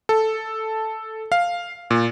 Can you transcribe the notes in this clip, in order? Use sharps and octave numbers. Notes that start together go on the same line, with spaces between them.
A4
F5
A#2